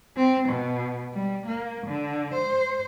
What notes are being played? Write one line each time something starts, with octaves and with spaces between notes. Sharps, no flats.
C4
B2
G3
A#3
D3
C5